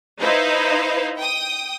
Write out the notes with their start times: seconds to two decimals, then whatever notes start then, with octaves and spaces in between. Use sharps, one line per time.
0.20 D#4 E4 B4 C5 F5
1.16 G5 D#6